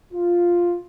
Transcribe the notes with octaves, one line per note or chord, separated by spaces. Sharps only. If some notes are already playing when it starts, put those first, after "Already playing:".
F4